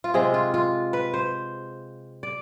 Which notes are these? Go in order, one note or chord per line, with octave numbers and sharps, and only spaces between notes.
F4
C3 G#3 G#4
F4
F4
B4
C5
D5